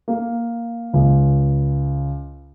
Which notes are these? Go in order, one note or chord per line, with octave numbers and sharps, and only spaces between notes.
A#3
C#2